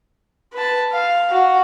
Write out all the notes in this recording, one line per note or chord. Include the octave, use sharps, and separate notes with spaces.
B4 A5
F5
F#4